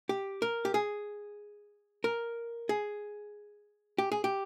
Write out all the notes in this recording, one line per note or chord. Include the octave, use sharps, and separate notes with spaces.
G4
A#4
G4
G#4
A#4
G#4
G4
G#4
G4